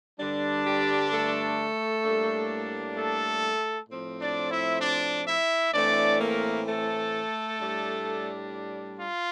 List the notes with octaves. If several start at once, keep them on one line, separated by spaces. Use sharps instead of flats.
G2 D3 G3 D4
G3 G4
A3 A4
A2 G3 A#3 D4
A3 A4
A2 F3 C4
D4 D5
E4 E5
D4 D5
E4 E5
A2 E3 A3 C4 D4 D5
A#3 A#4
A3 A4
A2 G3 D4
F4